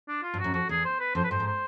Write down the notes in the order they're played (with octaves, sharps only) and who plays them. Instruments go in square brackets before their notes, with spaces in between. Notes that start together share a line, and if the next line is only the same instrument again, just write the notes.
[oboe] D4
F4
[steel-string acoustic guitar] G2
[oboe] F#4
[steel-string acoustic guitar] F#2
[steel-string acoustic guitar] F2 [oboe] F#4
[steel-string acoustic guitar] E2 [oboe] G#4
[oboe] C5
B4
[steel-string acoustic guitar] F2 [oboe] C5
[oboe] B4
[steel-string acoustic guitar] G2 [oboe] C5
[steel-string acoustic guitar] G#2
[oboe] C5